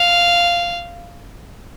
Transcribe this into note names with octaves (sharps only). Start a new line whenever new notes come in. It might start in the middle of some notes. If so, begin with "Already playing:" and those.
Already playing: F5